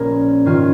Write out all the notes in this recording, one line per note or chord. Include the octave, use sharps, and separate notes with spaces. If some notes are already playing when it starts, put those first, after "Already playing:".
Already playing: A#1 A#2 G#3 C#4 A#4
G#2 D#3 C#4 F4